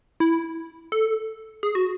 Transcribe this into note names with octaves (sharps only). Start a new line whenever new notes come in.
E4
A4
G#4
F#4